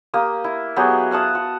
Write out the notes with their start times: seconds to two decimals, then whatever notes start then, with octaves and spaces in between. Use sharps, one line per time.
0.14 A#3 G4 D#6
0.44 E4
0.76 F#3 B3 G4 G#4
1.11 F5 F#5 A5 D#6
1.35 F#4